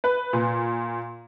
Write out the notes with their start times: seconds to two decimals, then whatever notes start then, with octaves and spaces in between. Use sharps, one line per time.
0.04 B4
0.33 A#2